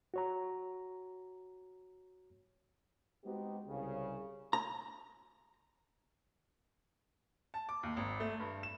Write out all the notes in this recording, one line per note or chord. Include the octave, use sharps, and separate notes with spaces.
F#4 C#5 A#5
G#3 B3 C4 D#4 F#4 G4
C2 C#3
A#5
A5
D6
D#2
G#1
A3
G2
E7